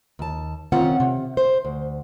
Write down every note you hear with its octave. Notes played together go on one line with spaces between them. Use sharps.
D#2 A5
D#3 C4 C#4 F4 F#5
C3
C5
D2